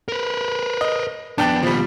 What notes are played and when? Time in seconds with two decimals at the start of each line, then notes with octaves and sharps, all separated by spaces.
0.08 A#4 B4
0.81 D#5
1.38 F2 B3 D4 G5 A5
1.63 D#2 B2 F3 G3